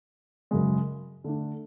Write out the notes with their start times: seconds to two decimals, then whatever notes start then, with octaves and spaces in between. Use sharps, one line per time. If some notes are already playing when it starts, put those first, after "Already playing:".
0.51 F#2 C#3 G#3
1.24 D3 A3 D4